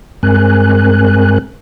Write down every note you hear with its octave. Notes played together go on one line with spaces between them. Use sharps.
G2 G#3 C4 A#4 G#5 F#6